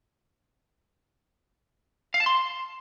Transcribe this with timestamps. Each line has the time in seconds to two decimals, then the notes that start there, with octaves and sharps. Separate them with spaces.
2.14 F5
2.20 A5
2.26 C6